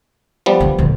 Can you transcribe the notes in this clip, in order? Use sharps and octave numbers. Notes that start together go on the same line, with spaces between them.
F3 G3 B3
D2
D2 A#2